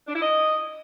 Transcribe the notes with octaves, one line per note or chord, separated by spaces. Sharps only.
D4
E4
D#5